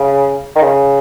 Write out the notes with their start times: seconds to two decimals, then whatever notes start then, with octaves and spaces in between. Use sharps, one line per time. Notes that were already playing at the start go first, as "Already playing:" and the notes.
Already playing: C#3
0.56 D#3
0.62 C#3